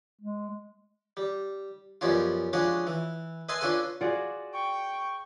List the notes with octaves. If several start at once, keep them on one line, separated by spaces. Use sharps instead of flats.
G#3
G3
F#2 B2 F3 G3 C#4 F4
F3 G#3 C#4 D4 F#4 G#4
E3
B4 D#5 E5 G#5 A5 C6
C#4 D4 F4 A4 B4 G#5
F4 F#4 G#4 D5 F#5
G5 C#6